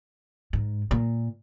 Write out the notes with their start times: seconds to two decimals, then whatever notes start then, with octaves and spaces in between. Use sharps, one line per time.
0.53 G#2
0.91 A#2